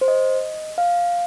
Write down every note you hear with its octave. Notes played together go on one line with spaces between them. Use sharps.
C5
D#5
F5